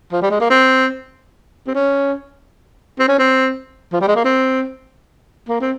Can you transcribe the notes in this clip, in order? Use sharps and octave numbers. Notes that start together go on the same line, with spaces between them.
F3
G3
G#3
A#3
C4
C4
C#4
C4
C#4
C4
F3
G3
G#3
A#3
C4
A#3
C4